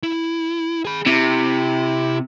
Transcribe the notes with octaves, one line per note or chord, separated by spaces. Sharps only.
E4
G#4 B5
C3 E4